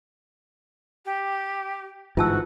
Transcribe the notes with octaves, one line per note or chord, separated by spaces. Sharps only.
G4
G1 G#2 E3 F4 F#4 A5 E6